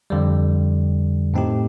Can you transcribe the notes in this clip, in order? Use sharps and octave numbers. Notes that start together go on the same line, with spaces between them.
F2 D3 G3
A2 A3 C4 D#4 G4